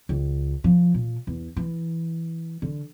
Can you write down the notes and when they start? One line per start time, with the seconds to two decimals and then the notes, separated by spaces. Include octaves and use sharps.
0.09 C#2
0.64 F3
0.94 A#2
1.27 E2
1.57 E3
2.62 D3